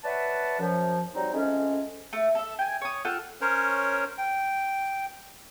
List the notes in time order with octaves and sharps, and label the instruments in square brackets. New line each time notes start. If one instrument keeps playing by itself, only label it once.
[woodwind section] B4 C#5 D5 E5 F#5 A5
F#2 F3
F#3 G3 C4 D#4
F2 G#3 A3 C#4
[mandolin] A3
A4 E5
G5 G#5
C#5 D#6
F4 A4 F#5 G5
[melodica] C#4 A#4 C5 C#5
G5